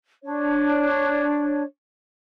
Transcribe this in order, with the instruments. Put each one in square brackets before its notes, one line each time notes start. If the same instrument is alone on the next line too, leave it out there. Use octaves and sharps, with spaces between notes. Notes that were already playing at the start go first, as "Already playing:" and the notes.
[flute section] D4 C#5